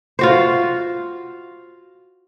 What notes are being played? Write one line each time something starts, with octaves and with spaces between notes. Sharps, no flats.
F4 F#4 C5